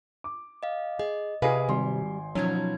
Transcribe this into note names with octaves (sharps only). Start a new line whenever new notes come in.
D6
D#5 F5
G#4 D#5
C3 G#4 B4 D#5 F5 G#5
G#1 G3 C6
B2 F3 F#3 C#4 D#4 G#6